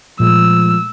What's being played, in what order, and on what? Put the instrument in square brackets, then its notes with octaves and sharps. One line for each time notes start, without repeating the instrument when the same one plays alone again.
[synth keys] A#2 G#3 A3 [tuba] F3 [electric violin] E6